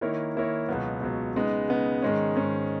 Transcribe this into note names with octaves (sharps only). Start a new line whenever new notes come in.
D#3 A#3 E4 A#4 C#5
D#3 A#3 E4 A#4 C#5
C#2 B2 F#3 B3
C#2 B2 F#3 B3
C#3 G#3 B3 D#4
C#3 G#3 B3 D#4
G#2 D#3 G#3 C#4
G#2 D#3 G#3 C#4